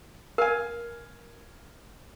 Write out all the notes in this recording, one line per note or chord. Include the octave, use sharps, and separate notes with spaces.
A#4 F5 G#5